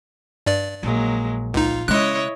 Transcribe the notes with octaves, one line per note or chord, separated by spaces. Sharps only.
G2 D5
A#1 F#3 G#3 A#3
C#2 D#4 F4
C#3 G#3 E4 C#5 D#5 F#6